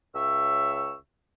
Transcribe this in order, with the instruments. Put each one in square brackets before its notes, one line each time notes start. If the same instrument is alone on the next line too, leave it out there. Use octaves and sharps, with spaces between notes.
[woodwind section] C#2 C#5 E5 E6